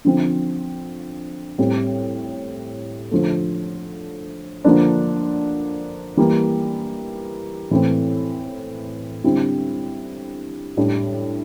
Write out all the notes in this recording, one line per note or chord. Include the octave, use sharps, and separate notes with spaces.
D3 F3 C4
A2 G3 C4
D3 F3 A3
D3 F3 A#3 D4
E3 G3 A#3
A2 E3 A3 C4
D3 G3 C4 E4
A2 G3 D4